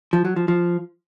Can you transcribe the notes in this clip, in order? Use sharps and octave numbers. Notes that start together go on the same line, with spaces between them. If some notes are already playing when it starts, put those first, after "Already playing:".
F3
F#3
F3
F3